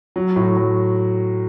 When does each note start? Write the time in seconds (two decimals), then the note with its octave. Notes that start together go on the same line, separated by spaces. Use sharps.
0.16 F#3
0.36 A2
0.57 F#3